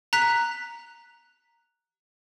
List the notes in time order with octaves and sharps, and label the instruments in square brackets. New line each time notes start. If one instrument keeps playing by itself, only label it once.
[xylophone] A#5 F#6 B6